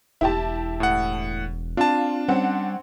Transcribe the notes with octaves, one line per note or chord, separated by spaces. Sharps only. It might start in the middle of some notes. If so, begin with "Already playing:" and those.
E1 E4 G4 A5
A2 F#5
C4 D4 F4 A5
G3 C4 C#4 F#5